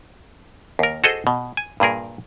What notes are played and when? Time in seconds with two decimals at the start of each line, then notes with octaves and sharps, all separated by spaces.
0.79 D#2 A#4
1.04 F#4 G#4 A4 C5 D#5
1.27 B2
1.57 G#5
1.80 G2 A#2 G#4 A#4